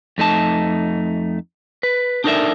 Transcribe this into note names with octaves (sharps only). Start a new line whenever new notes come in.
F2 A3 D#4 A5
B4
D4 D#4 A4 A#4 D5 E5